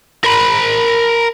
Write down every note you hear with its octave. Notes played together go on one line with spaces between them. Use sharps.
A#4 B5